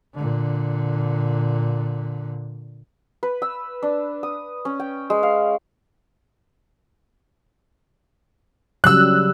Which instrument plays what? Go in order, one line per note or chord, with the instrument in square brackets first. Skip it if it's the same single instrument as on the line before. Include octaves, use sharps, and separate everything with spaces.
[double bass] A#2 D3
[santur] B4
E6
D4
D#6
C#4
G5
G#3
F5
[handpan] C#3 F#3 G3 [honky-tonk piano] E6 F#6